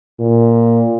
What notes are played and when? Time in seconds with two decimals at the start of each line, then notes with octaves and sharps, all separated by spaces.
0.19 A#2